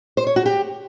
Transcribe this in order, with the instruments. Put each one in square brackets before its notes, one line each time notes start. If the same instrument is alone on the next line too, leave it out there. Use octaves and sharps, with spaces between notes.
[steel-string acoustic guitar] C5
C#5
F#4
G4